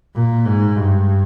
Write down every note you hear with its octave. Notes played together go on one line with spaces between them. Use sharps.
A#2
G#2
G2